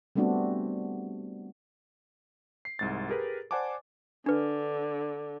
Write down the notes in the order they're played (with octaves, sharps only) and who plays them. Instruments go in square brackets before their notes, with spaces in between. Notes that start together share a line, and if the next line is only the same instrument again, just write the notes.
[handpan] G3 A3 B3 C4 D4 F#4
[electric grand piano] C7
C2 G#2 A6
G4 G#4 A#4 B4
C5 D5 F#5 G#5 A5 D6
[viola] D3 [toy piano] D4 B4